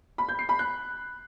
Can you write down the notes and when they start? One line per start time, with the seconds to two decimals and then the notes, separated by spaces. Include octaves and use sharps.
0.18 B5
0.29 G6
0.39 C7
0.49 B5
0.59 F#6